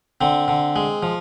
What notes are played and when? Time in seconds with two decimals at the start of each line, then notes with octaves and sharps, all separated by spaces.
0.21 D3 C4
0.48 D3
0.76 G#3
1.03 F3